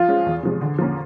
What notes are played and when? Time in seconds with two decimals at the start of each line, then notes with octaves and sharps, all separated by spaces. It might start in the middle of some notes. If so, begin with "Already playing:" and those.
Already playing: F3 F4
0.08 G#3 C#4
0.26 E2
0.43 C3 F3 G#3
0.61 D3
0.78 F3 A#3 C#4